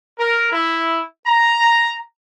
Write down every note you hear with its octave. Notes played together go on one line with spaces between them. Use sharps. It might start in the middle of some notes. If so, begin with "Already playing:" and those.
A#4
E4
A#5